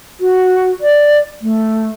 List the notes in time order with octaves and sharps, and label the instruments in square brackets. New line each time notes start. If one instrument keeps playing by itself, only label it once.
[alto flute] F#4
D5
A3